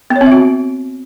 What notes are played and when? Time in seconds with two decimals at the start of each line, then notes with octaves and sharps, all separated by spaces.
0.10 B3
0.16 C#5
0.21 C4
0.26 E5
0.32 F#4